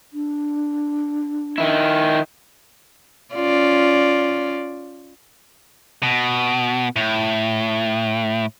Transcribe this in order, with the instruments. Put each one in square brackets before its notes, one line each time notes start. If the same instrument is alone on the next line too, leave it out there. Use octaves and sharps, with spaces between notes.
[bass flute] D4
[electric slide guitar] D#3 E4
[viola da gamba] C#4 F4 D5
[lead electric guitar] B2
A2